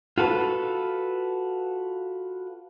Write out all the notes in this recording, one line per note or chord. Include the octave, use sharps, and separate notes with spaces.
F4 F#4 A4 B4